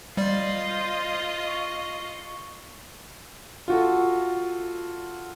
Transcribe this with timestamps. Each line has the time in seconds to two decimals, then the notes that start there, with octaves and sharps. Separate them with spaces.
0.17 G3 F4 C5 D5 D#5
1.47 C#6
3.68 F4 F#4 A4